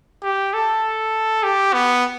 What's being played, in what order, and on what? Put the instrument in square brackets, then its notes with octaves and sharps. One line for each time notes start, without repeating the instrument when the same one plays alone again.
[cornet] G4
A4
G4
B3